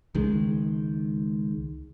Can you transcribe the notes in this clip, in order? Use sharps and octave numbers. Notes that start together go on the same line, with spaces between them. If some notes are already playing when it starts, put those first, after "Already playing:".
C#2 D#3 G#3